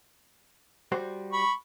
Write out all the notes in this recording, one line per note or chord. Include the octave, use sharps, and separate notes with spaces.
G3 F#4 C5
B5 C#6